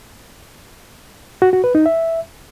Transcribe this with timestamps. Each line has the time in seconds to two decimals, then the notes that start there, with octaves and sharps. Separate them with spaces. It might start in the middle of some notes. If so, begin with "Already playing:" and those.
1.42 F#4
1.53 F#4
1.64 B4
1.75 D#4
1.86 E5